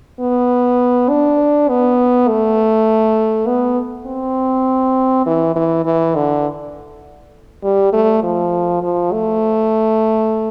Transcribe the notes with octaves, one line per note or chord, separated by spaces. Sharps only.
B3
D4
B3
A3
B3
C4
E3
E3
E3
D3
G3
A3
F3
F3
A3